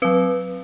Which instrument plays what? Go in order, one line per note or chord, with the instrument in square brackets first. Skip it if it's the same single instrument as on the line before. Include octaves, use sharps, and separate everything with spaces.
[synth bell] F#3 C4 B4